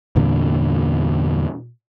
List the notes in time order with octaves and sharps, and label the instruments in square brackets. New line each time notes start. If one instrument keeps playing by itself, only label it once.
[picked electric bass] E2 G2 A#2 D3